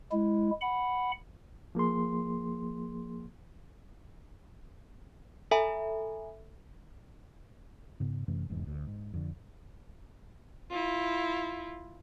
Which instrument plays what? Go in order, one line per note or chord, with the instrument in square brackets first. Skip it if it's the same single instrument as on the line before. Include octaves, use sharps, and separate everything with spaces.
[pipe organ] G#3 E4
F#5 B5
[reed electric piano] F3 A#3 G#4 C6
[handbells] A4 E5 G#5 A#5 B5
[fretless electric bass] G#2 C#3 B3
F#2 C3 E3 A3
F1 E2 G#2
D2
G#2
F2 D3
[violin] E4 F4